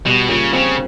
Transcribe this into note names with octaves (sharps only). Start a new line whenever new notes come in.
B2 G3
A#2 C#3
C#3 C4